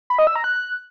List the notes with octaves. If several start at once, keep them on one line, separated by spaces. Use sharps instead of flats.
B5
D#5
E6
A#5
F#6